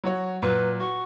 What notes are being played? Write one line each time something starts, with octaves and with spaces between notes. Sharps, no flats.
F#3 F#4 C#5
A#2 F#3 B4
F#4 C#6